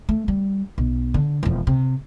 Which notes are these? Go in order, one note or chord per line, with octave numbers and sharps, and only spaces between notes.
A3
G3
B1
D3
E1 F2
C3